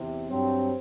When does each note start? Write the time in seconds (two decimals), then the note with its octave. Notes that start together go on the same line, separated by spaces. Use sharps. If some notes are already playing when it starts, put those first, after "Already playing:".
Already playing: E2 C3
0.29 G2 F#3 C4